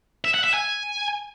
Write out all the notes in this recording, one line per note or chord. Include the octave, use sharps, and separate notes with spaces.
E5
F#5
E5
G#5